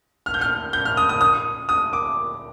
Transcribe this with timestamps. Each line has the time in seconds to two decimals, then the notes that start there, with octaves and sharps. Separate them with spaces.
0.26 F6
0.34 G6
0.41 F6
0.73 G6
0.85 F6
0.97 D#6
1.09 D#6
1.21 D#6
1.69 D#6
1.93 D6